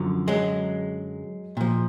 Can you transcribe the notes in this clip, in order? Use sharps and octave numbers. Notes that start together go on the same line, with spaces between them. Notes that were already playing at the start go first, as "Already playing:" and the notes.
Already playing: F#2 D3 F3
F#3 G#3
A#2 F3